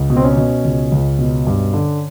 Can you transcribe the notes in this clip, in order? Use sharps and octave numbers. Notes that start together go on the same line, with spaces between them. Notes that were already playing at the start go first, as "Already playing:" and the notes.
Already playing: C#2
B2
C4
C#4
B2
C#2
C#2
B2
G2
D3